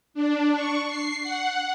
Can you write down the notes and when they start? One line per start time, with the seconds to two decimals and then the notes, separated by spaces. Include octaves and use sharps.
0.14 D4
0.54 C#6
0.87 C7
1.23 F#5